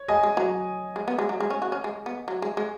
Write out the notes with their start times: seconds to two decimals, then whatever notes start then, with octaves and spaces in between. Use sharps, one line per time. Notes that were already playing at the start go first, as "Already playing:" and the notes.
Already playing: C#5
0.08 G#3 D#5 G#5
0.23 G#3
0.37 F#3
0.96 G#3
1.08 B3
1.19 G#3
1.29 F#3
1.40 G#3
1.50 C#4
1.62 F#4
1.72 C#4
1.84 G#3
2.06 B3
2.28 F#3
2.42 G#3
2.57 G#3